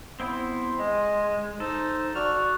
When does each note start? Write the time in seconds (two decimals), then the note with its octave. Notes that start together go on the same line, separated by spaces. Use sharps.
0.20 B3 C4 E4 C6
0.79 G#3 D#5
1.60 D#4 A4 C5
2.15 F#4 D5 F6